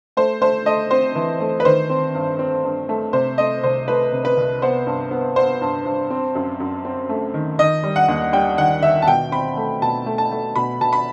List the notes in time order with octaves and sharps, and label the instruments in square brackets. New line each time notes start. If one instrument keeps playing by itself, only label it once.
[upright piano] A3 C5
A3 C5
A3 D#5
C4 C5
E3
A3
B4
D#3 C5
C4
G2
C4
G2
A3
C3 C5
A3 D#5
C2 C5
A3 B4
C3
B4
C2
B3 C5
G2
B3
B3 C5
G2
G2
C4
F#2
F#2
C4
A3
D#3
D#3 D#5
G3
F#5
D#2
G3 G5
D#3 F#5
D#3 E5
A5
B2 G5
C4 B5
A3
B2 A5
A3
A5
A3
B2 B5
B2 A5
B5